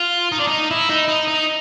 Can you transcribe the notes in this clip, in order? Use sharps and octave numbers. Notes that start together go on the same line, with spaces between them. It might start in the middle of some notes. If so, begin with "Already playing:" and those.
Already playing: F4
D#4
D4
D#4
E4
D#4
D#4
D#4